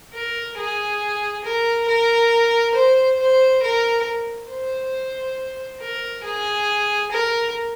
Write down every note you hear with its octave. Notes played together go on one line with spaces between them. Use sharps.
A#4
G#4
A#4
A#4
C5
C5
A#4
C5
A#4
G#4
A#4